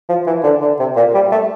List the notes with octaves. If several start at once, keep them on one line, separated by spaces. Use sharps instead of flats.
F3
E3
D3
D3
C3
A#2
G3
A3